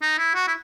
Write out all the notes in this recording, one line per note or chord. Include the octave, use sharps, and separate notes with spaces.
D#4
E4
F#4
E4